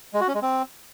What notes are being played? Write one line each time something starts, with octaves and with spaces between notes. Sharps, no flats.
G#3
F#4
C#4
G#3
C4